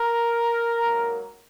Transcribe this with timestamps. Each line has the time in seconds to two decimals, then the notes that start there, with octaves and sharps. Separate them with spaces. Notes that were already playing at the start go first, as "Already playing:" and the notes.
Already playing: A#4
0.84 G#2 F#3 A#3